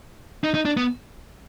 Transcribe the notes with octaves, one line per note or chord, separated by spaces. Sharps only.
D#4
D#4
D4
B3